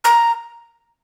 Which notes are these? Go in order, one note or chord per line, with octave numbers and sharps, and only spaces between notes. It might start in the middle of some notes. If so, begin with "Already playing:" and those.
A#5